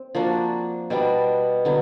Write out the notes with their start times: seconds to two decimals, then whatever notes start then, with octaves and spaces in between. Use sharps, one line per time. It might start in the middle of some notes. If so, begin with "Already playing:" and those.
Already playing: C4
0.15 F3 A#3 D4 F#4
0.90 B2 G3 B3 D4
1.65 D3 F#3 B3